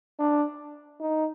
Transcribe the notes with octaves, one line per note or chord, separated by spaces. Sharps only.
D4
D#4